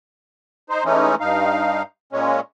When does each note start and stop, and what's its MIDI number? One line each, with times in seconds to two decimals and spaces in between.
0.70 0.84 63
0.70 0.84 72
0.85 1.15 52
0.85 1.15 56
0.85 1.15 57
0.85 1.15 61
0.85 1.15 63
1.20 1.82 43
1.20 1.82 63
1.20 1.82 77
2.13 2.40 46
2.13 2.40 56
2.13 2.40 61